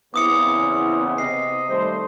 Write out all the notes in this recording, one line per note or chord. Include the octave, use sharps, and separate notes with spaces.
E2 C#3 B3 C4 E4 D6 D#6 C#7
C3 D#5 C7
D#3 G3 A3 C5